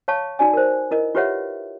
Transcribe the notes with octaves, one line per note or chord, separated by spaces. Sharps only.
C#5 F5 A5 C#6
D#4 F#4 D5 G#5
A#4 C5
E4 A#4 D#5
F4 G4 B4 C#5 E5 F#5